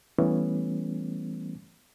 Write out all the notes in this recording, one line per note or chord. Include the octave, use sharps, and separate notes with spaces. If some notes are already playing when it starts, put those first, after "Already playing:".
E3 G3 A3 B3 C#4